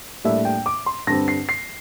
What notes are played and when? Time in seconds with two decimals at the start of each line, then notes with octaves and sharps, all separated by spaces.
0.24 A2 G3 A#3 D4 E5
0.45 G5
0.66 D6
0.86 C6
1.07 G2 D3 G3 C4 A#6
1.28 C7
1.49 C7